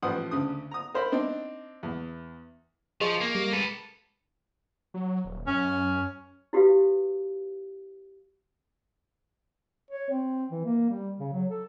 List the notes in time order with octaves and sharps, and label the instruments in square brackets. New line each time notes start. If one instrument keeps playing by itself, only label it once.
[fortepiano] A1 F3 B4 C5 F#5 D#6
D2 C#3 D#6
A#5 D#6
A#4 C5 E5 B5
C4 D4 D#4
E2
[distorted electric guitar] F3 [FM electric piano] G#4 D#5 C#6
[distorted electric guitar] A#3
[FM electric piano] G3
[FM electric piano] G#3 [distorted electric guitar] A4 B4
[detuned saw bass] F#3
D#1
[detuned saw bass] F#2 [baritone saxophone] C#4
[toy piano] E4 F#4 G4 A4 B4 F5
[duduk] C#5
C4
E3
A#3
G3
C#3
F#3
A4